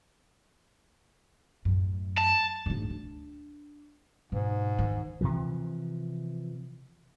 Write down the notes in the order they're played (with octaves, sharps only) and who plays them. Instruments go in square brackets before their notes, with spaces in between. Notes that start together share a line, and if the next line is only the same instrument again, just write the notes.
[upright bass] F#2 A2
[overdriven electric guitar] A5
[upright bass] D2 G#2
D4
[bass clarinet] G#2 [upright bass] B2
[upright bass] D#3
[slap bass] C3 E3 F3